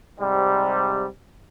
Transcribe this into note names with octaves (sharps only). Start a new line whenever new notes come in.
G#2 C3 G3